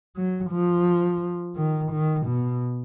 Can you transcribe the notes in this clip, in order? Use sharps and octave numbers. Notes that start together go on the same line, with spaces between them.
F#3
F3
D#3
D#3
B2